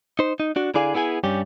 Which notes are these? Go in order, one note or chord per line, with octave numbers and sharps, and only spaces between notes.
D#4 C5
D#4
D4 F#4
D3 E4 G#4 D5 F5 G#5
B3 E4 G#4 G5 G#5
G2 G3 C#4 G4